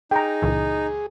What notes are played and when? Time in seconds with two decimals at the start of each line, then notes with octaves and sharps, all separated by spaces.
0.11 D#4 G#4 G5 A#5
0.42 C#2 A#2 E3